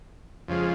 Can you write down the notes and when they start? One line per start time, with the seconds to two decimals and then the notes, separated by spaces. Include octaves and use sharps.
0.48 F2 C#3 F3 G#3